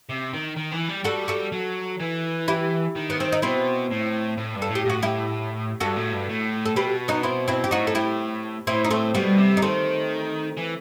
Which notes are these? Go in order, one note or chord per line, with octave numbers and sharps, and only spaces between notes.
C3
D#3
D#3
E3
G3
G3 F#4 A4
F#4 A4
F#3
E3
E4 G4
D#3
B3
C4
D#4
B2 C4 E4
A2
A2
G2
A4
A2
G4
A2 F#4
E4 G4
G2 F#4 A4
A2
G2
A2
A4
B2 G4 B4
B3 D#4
C4 E4
C4 E4
G4
A2 D#4 F#4
A4
E4 G4
A2 C4 E4
D#4
A3 C4
B2 G3 B3
C3
D#4
D#3 A3 C4
E3